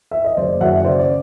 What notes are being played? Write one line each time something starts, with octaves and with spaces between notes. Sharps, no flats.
E5
D#5
F#1 C5 D5
F#2 E5 F#5
C#3 C5 D5
D5